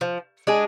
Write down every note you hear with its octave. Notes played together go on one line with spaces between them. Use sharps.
F3
G#3 D4 G#4